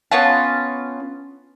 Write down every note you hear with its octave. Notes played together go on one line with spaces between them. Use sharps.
B3 C#4 F4 A5